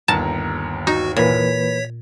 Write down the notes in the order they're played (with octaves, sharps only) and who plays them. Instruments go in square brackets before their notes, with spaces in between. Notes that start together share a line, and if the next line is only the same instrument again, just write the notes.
[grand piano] G1 D#2 [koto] A5 [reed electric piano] A#5
[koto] D#4 [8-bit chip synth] F#4
[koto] A#2 [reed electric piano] E3 A#3 B4 [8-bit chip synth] C#5 B6